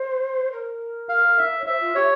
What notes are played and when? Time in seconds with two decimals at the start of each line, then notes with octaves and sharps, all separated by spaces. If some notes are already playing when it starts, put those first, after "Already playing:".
Already playing: C5
0.52 A#4
1.09 F5
1.38 E5
1.59 C#5
1.66 C5 E5
1.80 F4
1.95 G4 C#5